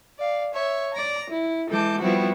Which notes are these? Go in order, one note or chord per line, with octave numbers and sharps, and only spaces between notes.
D5 F5
C#5 E5
D5 A#5
E4
E3 G#3 A4 A5 D6 G6
F3 G3 B3 C4 E4 F#4